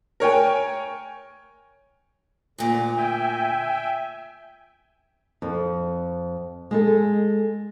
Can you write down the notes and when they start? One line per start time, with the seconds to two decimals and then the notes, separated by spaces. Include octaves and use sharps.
0.20 A#4 C#5 G5 G#5
2.58 D2 A#2 D3
2.97 E5 G5 G#5
5.42 F2
6.71 G#3 G#4 A4